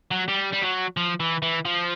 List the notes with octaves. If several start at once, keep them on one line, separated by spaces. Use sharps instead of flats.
F#3
G3
G3
F#3
F3
E3
E3
F3